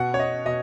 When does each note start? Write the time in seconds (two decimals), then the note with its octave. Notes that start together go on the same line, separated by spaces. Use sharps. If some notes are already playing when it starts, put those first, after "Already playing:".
Already playing: B2 F#5
0.14 C#5
0.19 D#5
0.45 B2 D#5